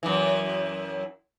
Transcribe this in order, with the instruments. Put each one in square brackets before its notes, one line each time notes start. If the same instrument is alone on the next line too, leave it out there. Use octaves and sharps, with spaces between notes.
[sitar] F#2 E3